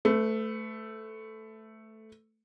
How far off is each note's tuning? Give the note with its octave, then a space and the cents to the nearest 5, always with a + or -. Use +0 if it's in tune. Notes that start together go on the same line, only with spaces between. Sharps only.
A3 +0 B4 +35